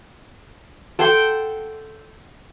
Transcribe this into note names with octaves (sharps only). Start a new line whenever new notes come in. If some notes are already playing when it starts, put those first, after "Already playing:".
A4 F#5 G5 C6